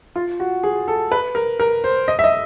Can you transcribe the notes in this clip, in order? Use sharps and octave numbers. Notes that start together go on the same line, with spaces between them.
F4
F#4
G#4
A4
B4
A#4
A#4
C5
D#5
E5
D#5